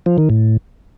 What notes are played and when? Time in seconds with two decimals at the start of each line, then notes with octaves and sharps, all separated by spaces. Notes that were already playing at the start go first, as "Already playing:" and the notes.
0.06 F3
0.18 D#3
0.30 A2